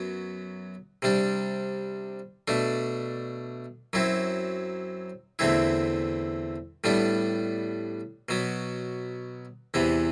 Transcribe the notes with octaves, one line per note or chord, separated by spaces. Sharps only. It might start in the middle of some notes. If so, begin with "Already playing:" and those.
Already playing: F#2 F#3 B3
C3 G3 D4
B2 A3 D4
F#2 F#3 C4 E4
E2 D3 A3 C4 E4
A2 G3 B3 D4
B2 F#3 B3
E2 C3 E3 B3